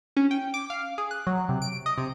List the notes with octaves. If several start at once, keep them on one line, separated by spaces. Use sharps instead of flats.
C#4
G5
D6
F5
G#4
F#6
F#3
C3
D7
D#5
C3